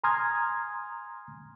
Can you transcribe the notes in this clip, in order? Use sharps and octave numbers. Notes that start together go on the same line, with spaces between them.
G#5 A#5 C6 D#6 F6 G#6